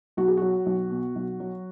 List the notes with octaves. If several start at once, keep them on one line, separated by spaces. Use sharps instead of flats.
B1 F#4
G#4
F#3 F#4
B1
B2
B1
F#3